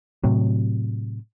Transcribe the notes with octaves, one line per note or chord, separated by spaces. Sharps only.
A2 C3 F#3